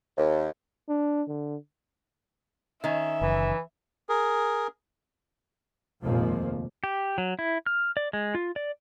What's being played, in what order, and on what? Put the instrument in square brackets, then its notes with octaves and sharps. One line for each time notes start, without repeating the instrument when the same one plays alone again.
[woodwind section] D#2
[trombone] D4
D3
[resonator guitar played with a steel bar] D#3 C#4 [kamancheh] E5
[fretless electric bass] F#1 [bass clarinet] E3
[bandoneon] G#4 A#4
[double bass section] F1 D#2 A#2 F3 G#3 A#3
[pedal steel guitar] G4
F#3
E4
F6
D5
G#3
F4
D5